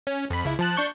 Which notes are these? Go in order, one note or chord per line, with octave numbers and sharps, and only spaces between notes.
C#4
F2 B5
C#2 E4
F3 A5 F#6
D4 C#6 G6